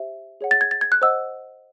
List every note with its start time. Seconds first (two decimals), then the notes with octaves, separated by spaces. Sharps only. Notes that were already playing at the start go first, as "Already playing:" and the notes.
Already playing: G4 C5 E5
0.41 G#4 C#5 F#5
0.51 A6
0.61 G#6
0.71 A6
0.81 G#6
0.92 F#6
1.02 C5 D#5 F#5 E6